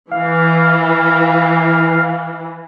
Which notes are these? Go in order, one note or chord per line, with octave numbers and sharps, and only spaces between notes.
E3 F5